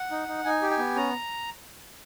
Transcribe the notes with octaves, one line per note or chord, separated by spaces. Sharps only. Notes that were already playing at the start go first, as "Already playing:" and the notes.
Already playing: F#5
D#4
D#4
D#4 G#5
G4
G#5
B3
C#4 A#5